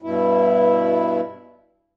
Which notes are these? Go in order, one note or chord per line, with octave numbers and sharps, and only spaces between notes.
G2 B2 E4